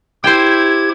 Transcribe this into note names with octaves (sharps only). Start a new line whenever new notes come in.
E4 G4 C5 G5 G#6